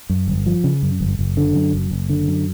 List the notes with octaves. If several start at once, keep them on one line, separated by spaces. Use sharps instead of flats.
F#2
G1
F3
C#3
F#2
G1
F#1
D3
F#2
F#1
F#1
D3
F#2